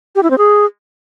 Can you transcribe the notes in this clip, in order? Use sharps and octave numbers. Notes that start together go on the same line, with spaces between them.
G4
E4
C4
G#4